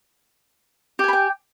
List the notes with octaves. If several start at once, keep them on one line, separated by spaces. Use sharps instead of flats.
G4 G5 G#5 B5